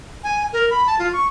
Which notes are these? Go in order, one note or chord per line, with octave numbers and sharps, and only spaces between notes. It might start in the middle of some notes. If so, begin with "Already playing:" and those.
G#5
A#4
B5
A5
F4
C#6